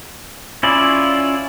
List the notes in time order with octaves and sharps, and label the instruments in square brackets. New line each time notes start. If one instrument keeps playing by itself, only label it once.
[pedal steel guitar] C#4 E4 F4 D5